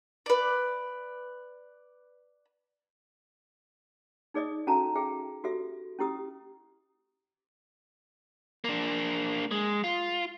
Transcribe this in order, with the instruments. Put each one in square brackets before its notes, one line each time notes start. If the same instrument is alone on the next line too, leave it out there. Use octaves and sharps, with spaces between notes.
[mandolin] B4 D5
[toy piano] D#4 G#4 D5 D#5 D#6
C#4 F#4 A4 F5 A5 A#5
G#4 E5 G5
F#4 G4 A4 E5
C#4 E4 G4 D#6
[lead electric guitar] A#3 D4
G#3
F4